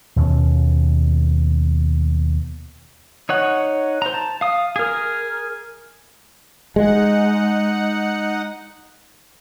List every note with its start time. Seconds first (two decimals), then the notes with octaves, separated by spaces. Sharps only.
0.16 D#2 B2 A#3 C#4
3.29 D#4 C#5 F#5
4.02 C5 A#5
4.14 A5
4.41 F5 D#6
4.76 G#4 A#4
6.76 G#3 D#4 F#5